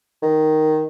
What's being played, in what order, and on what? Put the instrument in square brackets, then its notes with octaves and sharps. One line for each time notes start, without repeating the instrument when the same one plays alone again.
[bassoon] D#3